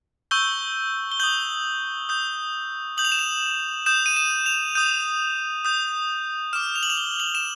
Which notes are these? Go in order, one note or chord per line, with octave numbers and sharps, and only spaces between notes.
C#6 E6 G6 G7
G7
D#6 G6 F#7
D#6 G6
D#6 G6 F#7
F7
E7
F7
D#6 G6 E7
D#7
E7
F7
D#6 G6 D#7
D#6 G6
D6 F6 E7
F7
F#7
F7
G7
F#7
E7